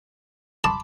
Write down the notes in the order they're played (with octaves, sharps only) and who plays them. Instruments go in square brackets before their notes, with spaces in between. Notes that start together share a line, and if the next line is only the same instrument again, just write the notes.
[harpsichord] A5 [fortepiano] B5 C6 D6